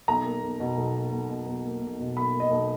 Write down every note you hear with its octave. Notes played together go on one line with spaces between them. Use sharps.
B1 A#5
A#3
B1
B2
B1
A#3
B1
B2
B1
A#3
B1
B2
B1 B5
A#3
D#5
B1